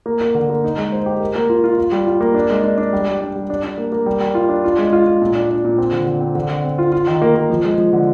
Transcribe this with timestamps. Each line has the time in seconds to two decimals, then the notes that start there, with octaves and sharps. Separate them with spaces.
0.06 A#3
0.21 A#3
0.35 D3
0.50 A#3
0.64 D#4
0.77 G#3
0.92 C5
1.06 G4
1.20 A#4
1.35 A#3
1.49 F4
1.64 F4
1.78 F4
1.92 G3
2.07 F4
2.21 A#3
2.34 D4
2.50 G#3
2.64 D4
2.78 D4
2.93 G3
3.07 G3
3.21 D4
3.36 G3
3.50 D4
3.63 D4
3.77 A#3
3.92 A#3
4.06 G3
4.20 G3
4.35 F4
4.49 D4
4.64 F4
4.78 G#3
4.93 F4
5.07 F4
5.22 A#2
5.35 D4
5.50 D4
5.64 A#2
5.78 C4
5.92 D3
6.06 D3
6.20 C4
6.35 D3
6.49 D3
6.64 C4
6.78 F4
6.92 F4
7.07 D#3
7.22 A#3
7.35 A#3
7.50 F3
7.64 G#3
7.78 F3
7.93 D3